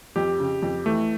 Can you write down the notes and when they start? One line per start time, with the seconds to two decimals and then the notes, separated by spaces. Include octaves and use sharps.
0.16 F2 G4
0.40 C#3
0.62 F2
0.86 E3 A3